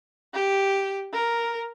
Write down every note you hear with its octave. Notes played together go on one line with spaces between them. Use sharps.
G4
A#4